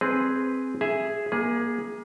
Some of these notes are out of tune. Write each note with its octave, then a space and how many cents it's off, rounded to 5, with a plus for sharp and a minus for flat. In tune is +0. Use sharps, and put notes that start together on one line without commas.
C4 +0 G#4 +0 B4 +0
G#4 +0 E5 +0
A#3 +25 G#4 +0